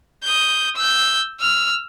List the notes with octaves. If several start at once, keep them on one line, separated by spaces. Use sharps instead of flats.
D#6 G6
E6 G6
E6 F6